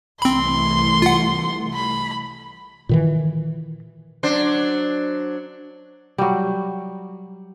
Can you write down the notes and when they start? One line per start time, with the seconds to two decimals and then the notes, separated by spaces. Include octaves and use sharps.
0.22 C2 E3 A3 C4 B5 C6
1.02 F4 F#5
1.74 B5
2.89 A#2 D#3 E3
4.23 F#3 D4 C5
6.18 F#3 G3